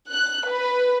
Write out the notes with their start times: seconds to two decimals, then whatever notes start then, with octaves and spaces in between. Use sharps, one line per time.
0.12 F#6
0.50 B4